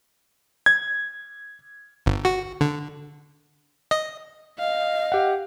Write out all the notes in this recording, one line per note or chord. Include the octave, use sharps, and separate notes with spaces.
G#6
G1
F#4
D3
D#5
D#5 F5
G4 F#5